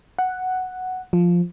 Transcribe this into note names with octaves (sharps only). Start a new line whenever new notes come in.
F#5
F3